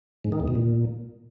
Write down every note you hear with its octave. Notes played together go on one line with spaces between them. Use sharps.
G#2
D#3
E2
B2
A#2